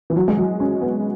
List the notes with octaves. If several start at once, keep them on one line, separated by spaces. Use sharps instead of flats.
E3
F#3
G#3
F#3
C#4
B3